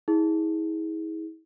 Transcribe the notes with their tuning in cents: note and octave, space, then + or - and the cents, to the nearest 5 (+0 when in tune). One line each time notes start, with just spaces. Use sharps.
E4 -40 G#4 +0